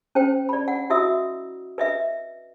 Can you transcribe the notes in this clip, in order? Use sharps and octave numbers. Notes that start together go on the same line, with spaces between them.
C#4 C5 G5
D5 B5
F#5
E4 F#4 D#5 E5 D#6 E6
B4 D#5 E5